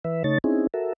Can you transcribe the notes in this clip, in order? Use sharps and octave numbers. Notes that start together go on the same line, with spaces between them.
E3 B4 E5
C#3 A3 D#4 C#5 A6
C4 C#4 D#4 E4 G#4
F#4 A4 A#4 E5